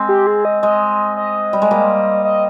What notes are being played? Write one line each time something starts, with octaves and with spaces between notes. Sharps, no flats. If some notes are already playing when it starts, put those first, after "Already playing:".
Already playing: G#3 C4
G4
G#4
D#5
G#3 D#5
D#5
G3
G#3
G3 A#3
D#5